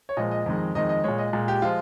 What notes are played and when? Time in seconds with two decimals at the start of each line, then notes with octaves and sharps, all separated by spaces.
0.09 C#5
0.17 A#2 F3 G#3 D#5
0.31 D#5
0.46 F2 D#3 G#3
0.75 F2 D#3 G#3 D#5
0.89 D#5
1.04 A#2 G#3 C#5
1.18 D#5
1.33 A#2 G#3
1.48 G4
1.62 F3 G#3 F4